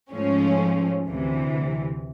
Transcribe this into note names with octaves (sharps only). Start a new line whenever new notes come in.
G#2 F3 A3 C#4
D2 C3 E3